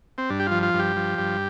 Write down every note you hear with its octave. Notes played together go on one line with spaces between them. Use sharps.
C4
G2 D4
G4
F3 F4
F4
G2
G4
F3
G2